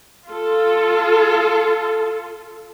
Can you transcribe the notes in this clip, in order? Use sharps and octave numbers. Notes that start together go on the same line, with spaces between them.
F4 A4